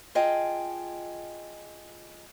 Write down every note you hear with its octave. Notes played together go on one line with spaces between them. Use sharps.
F4 G#4 D#5 G5 A5